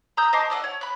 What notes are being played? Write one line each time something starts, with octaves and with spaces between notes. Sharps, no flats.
A#5 D#6 E6 G6
D#5 A5 C6 D6
A4 D5 D#5 F#5
C#5
B5 F#6